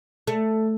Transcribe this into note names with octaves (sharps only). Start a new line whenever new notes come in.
A3